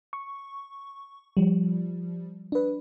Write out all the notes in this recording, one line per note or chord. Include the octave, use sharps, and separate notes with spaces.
C#6
F3 G3
D4 B4